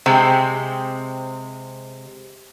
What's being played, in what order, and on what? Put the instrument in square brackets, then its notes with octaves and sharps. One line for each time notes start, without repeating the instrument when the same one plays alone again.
[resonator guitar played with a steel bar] C3 G#3 C4